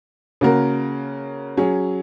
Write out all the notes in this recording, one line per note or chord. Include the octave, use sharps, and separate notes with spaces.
C#3 A#3 F#4 A#4
F#3 C#4 G#4